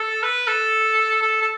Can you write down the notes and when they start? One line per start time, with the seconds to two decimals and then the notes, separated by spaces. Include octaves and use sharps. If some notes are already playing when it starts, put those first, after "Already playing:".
Already playing: A4
0.23 B4
0.47 A4
1.23 A4
1.42 A4